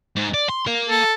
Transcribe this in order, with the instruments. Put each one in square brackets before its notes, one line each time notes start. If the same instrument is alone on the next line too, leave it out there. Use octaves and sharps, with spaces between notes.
[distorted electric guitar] G#2
D5
C6
A#4 F5
[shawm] A4